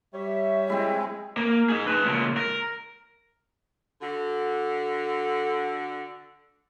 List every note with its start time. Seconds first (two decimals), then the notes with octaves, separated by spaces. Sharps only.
0.14 G3 C#5 E5
0.70 G#3 C4 E4
1.37 A#3
1.69 D#4 G#4
1.87 B4 A5
2.05 C#2 A#2
2.37 A#4
4.02 D3 F#4